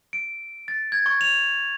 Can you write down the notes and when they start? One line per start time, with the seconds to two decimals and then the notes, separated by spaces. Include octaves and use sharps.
0.13 D7
0.68 A6
0.92 G#6
1.06 C#6
1.21 F7